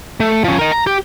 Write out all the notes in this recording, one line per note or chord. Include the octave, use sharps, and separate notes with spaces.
A3
F3 C#4
A#4 D#5
A#5
G4